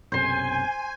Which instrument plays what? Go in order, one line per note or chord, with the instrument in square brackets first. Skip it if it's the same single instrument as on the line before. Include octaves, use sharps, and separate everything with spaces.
[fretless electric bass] B1 F#2 C3 [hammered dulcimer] C5 C6 [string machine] G#5